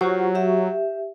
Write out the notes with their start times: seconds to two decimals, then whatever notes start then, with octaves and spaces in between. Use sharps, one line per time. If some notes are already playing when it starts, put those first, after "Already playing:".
0.01 F#3 F4 G4 C5
0.35 G4 E5